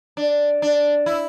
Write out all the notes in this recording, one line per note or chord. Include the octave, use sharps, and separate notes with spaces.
D4
D4
E4